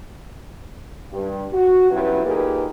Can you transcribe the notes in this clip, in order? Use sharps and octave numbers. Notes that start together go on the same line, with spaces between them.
G2
F#4
G2 B2 F#3 C#4 E4 B4
A#2 A#3 D#4 G4 G#4 B4